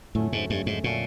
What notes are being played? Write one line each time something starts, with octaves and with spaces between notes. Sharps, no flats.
F2 A2 D3 F#3 A3 C#4
G#2
G2
G#2
A#2 D3 F#3 A3 C#4